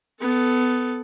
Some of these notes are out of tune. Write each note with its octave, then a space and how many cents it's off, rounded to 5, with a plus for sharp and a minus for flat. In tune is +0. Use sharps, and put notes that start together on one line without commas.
B3 +20 A4 +0